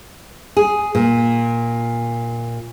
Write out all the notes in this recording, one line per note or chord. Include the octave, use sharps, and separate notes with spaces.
G#4
A#2